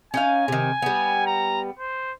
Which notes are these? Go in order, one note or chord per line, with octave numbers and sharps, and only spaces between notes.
C#4 D#4 F5 G#5
C3 D#3
G3 B3
A#5
C5